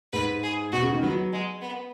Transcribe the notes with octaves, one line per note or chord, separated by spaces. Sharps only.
G#2 B4
G#4
B2 F#4
C#3
D#3
F#3 B3
G#3
B3